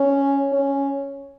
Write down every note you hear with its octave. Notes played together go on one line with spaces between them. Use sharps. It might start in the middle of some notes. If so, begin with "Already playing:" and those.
Already playing: C#4
C#4